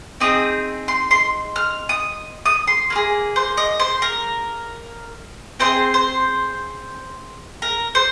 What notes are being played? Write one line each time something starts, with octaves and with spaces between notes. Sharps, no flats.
C4 D#4 G#4 D#6
C6
C6
F6
D#6
D#6
C6
A#3 F4
G#4
C5
D#5
C5
A#4
C4 D#4 G#4 C5
C5
A#4
C5